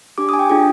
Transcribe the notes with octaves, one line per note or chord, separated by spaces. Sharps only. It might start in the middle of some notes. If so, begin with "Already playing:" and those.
D4 G4 D6
D#6
G#5
G5
D4 F4 G#4 G5